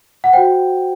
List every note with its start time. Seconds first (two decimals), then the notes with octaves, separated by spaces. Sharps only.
0.24 F#5
0.33 F#4 C5 G5